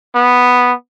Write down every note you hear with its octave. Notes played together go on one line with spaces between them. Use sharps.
B3